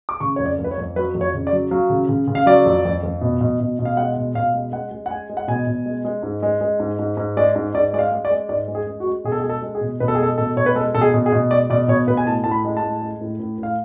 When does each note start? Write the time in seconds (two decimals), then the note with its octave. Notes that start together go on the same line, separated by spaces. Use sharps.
0.09 D6
0.20 C#3 C#6
0.36 F2 C#5
0.46 D5
0.59 F2
0.64 B4
0.71 C#5
0.78 F2
0.96 F#3 B4
1.15 F2
1.21 C#5
1.34 C#3
1.47 D5
1.52 F#3
1.71 F#3 F5
1.90 C#3
2.09 C#3
2.28 C#3
2.35 F5
2.46 F#3 D5
2.66 F2
2.85 F2
3.03 F2
3.21 B2
3.41 B2
3.60 B2
3.79 B2
3.85 F5
3.97 G#3 F#5
4.16 B2
4.35 B2 F5
4.54 G#3
4.72 G#3 F#5
4.91 G#3
5.06 F#5
5.10 G#3 G#5
5.29 G#3
5.37 F#5
5.48 B2 G#5
5.67 B2
5.86 G#3
6.05 G#3
6.23 G#2
6.42 G#3
6.61 G#3
6.80 G#2
6.99 G#2
7.17 G#2
7.37 G#3 D5
7.55 G#2
7.74 G#2 D5
7.93 G#3 D5
7.99 F5
8.11 G#3
8.25 D5
8.31 G#3
8.49 G#2 D5
8.68 G#3
8.75 G#4
8.87 G#3
9.00 F#4
9.06 G#3
9.24 B2 G#4
9.32 A4
9.40 G#4
9.43 G#3
9.49 A4
9.62 G#3
9.75 G#4
9.81 B2
10.00 B2 B4
10.08 A4
10.15 G#4
10.19 G#3 A4
10.38 B2 A4
10.56 B2 C#5
10.66 B4
10.75 G#3 A4
10.95 B2 A4
11.01 G#4
11.14 B2
11.26 G#4
11.32 B2
11.51 G#3 D5
11.70 B2 D5
11.88 B2 C#5
12.07 B2 B4
12.17 G#5
12.26 A2 A5
12.44 A2 A5
12.51 B5
12.65 G#3
12.77 A5
12.83 A2
13.02 G#3
13.21 A2
13.40 A2
13.58 A2 F5